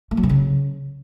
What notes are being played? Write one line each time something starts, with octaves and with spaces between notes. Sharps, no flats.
A3
F#3
C3
C#3